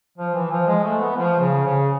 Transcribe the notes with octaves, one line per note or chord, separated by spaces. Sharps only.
F3
E3
F3
G#3
A3
B3
F3
C#3
C#3